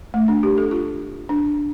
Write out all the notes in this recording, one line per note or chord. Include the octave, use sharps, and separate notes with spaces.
A3
D4
G4
A4
F4
D4